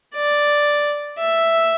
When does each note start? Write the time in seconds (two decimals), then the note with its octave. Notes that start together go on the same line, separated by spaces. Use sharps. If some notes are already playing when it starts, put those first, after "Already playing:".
0.15 D5
1.19 E5